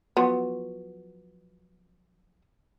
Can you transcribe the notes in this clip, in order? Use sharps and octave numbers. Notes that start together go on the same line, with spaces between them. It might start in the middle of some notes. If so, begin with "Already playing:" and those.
F3 F#3 B3